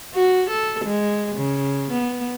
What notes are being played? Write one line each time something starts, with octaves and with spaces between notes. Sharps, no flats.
F#4
A4
G#3
C#3
B3